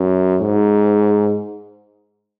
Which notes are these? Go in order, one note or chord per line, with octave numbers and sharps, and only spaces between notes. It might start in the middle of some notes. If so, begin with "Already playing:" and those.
Already playing: F#2
G#2